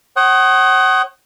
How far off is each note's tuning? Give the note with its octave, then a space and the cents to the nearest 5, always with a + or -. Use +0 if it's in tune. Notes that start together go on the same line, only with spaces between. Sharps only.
C#5 -40 F#5 +35 D#6 +0